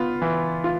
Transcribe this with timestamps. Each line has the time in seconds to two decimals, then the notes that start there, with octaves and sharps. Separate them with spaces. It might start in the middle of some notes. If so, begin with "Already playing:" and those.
Already playing: B3 F4
0.22 E3
0.64 F4